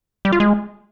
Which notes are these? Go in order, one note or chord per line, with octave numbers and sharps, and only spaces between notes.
G3
F4
G#3